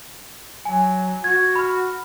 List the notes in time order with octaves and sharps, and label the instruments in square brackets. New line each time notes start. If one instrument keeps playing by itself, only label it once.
[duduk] F#3 [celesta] G#5
[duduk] F#4 [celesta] G#6
[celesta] B5 F6